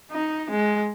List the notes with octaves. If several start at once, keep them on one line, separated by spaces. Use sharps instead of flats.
D#4
G#3